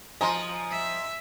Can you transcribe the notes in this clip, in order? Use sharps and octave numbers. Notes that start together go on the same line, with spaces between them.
F3 D#5 G#5 A#5 C6
E5